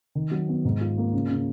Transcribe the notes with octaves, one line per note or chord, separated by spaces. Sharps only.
D#3
F#3
B3
G#2
F4
A#3
C#3
C#3